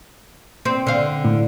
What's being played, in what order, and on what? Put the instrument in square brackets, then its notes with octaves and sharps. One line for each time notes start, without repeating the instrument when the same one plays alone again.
[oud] C4
D3 F5
[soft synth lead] A2